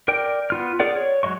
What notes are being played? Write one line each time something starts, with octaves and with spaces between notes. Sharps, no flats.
A#4 D5 G5
B3 F4 F6
G#4 A#4 D5 F#5
C#5
F#3 G#3 D#5 C#6